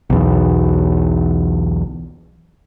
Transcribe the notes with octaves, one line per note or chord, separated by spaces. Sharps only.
B1 E2